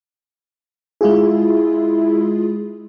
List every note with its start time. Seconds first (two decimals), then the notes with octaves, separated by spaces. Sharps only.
1.01 G#3 E4 F4 G#4